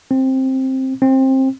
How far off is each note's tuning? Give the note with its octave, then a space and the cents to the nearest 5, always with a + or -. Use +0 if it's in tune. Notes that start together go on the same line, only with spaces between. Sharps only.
C4 +10
C4 +20